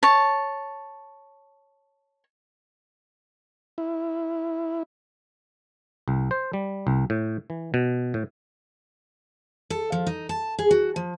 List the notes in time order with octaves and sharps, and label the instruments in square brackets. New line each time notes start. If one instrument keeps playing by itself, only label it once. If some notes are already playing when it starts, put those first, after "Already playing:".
[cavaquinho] C#5 A5
[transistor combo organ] E4
[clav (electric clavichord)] C2
C5
G3
C2
A2
E3
B2
A2
[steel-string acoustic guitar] A4
F3
D#4
A5
G#4
F#4
F3